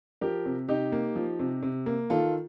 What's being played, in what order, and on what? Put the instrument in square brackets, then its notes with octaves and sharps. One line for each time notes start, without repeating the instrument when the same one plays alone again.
[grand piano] F3 G4 A#4
C3
C3 D#4 G4
A#3
F3
C3
C3
A#3
D#3 F4 A4